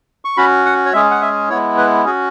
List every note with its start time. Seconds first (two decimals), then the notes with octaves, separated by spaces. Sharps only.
0.25 C#6
0.37 C#4 F#4 B5
0.66 F#5
0.86 C#5
0.93 G#3 C#4 G#4 E5
1.11 F#5
1.21 E5
1.49 G#3 B3 E4 C#5
1.78 B4
2.05 C#4 F#4 G#4